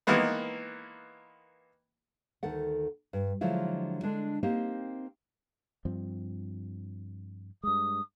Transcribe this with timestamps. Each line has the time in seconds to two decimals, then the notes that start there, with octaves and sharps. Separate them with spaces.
0.07 D#3 E3 G#3 A#3 B3
2.43 D2 D#3 A4 F#5
3.13 G2
3.41 D3 F3 F#3 G#3 E4 F4
4.03 D3 G#3 D4
4.43 A#3 C4 D#4 G4
5.85 G2 F3 C4
7.63 G2 G#3 D#6